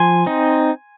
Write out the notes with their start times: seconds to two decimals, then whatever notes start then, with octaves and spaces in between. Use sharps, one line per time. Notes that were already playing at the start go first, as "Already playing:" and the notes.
Already playing: F3 G#5 C6
0.26 C4 D#4